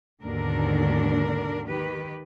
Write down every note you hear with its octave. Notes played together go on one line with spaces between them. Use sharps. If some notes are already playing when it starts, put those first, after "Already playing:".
D#2 G#2 B2 D3 D4 A#4
D#3 G4 B4